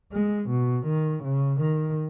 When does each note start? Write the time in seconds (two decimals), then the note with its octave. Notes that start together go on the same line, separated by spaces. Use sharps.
0.12 G#3
0.50 B2
0.87 D#3
1.23 C#3
1.60 D#3